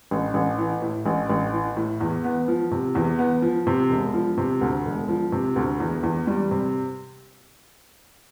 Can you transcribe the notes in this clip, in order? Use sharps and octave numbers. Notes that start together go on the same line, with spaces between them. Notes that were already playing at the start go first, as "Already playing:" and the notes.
A1
A1
E3
A2
A1
A1
E3
A2
E2
B3
F3
C3
E2
B3
F3
C3
E1
F3
C3
D2
E1
F3
C3
D2
E2
E2
G3
C3